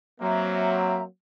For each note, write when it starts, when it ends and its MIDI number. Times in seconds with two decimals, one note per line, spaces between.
0.20 1.04 54
0.20 1.04 58
0.20 1.04 60
0.20 1.02 76
0.20 1.02 82